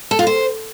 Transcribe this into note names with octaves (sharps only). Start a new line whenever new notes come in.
A4
F4
C5